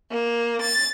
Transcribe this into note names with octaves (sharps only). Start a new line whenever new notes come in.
A#3
A6